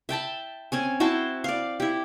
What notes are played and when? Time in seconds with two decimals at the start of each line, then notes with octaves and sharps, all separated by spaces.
0.09 E5 G5 A5 B5
0.72 C4 C#4 G#5
1.00 E4 F#4 C5 A5
1.44 D5 F5
1.80 E4 G4